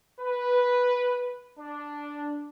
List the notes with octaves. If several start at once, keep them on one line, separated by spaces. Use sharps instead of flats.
B4
D4